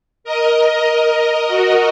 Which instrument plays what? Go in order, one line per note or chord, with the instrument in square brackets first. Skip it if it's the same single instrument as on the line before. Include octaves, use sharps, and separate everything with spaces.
[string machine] A#4 D#5
A#4 D#5
F#4